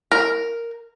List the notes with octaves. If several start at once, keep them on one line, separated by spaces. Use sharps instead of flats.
A#4